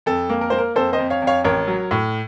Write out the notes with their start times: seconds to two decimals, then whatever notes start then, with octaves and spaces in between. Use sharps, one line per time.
0.06 F2 A4
0.30 A#3
0.41 A#4
0.50 A#3 C5
0.58 A#4
0.75 F2 A4 C5
0.93 C5 D#5
0.99 F2
1.10 C#5 F5
1.22 F2
1.27 C#5 F5
1.45 A1 A#4 C#5
1.68 F#3
1.91 A2